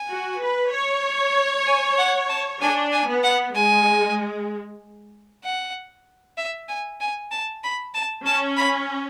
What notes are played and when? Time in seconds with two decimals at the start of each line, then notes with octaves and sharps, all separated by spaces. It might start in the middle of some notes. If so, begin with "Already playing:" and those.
Already playing: G#5
0.10 F#4
0.41 B4
0.72 C#5
1.67 G#5
1.98 F#5
2.29 A5
2.61 D4 G#5
2.92 G#5
3.08 B3
3.24 F#5
3.55 G#3 G#5
5.44 F#5
6.38 E5
6.69 G#5
7.01 G#5
7.32 A5
7.64 B5
7.94 A5
8.26 C#4 A5
8.57 B5